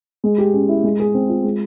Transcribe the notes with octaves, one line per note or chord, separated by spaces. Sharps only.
G#3
G4
C#4
E4
G#3
G#4
C4
F4
G#3